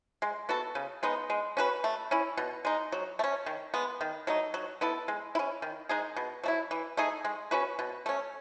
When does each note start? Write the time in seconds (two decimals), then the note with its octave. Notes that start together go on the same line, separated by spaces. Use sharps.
0.22 G#3
0.49 B3 F#4 A4
0.75 C#3
1.03 G#3 B3 D#4
1.30 G#3
1.57 C#4 F#4 B4
1.84 A3
2.11 C#4 E4
2.37 B2
2.65 G#3 D#4
2.92 F#3
3.19 A3
3.24 C#4
3.46 D#3
3.74 G#3 B3
4.01 D#3
4.27 F#3 A3 D#4
4.54 F#3
4.81 B3 E4 A4
5.08 G#3
5.35 E4
5.39 C#4
5.62 D#3
5.89 G#3 D#4 G#4
6.16 B2
6.44 F#3 A3 E4
6.71 E3
6.97 A3 D#4 G#4
7.25 G#3
7.51 C#4 F#4 B4
7.79 B2
8.06 A3 C#4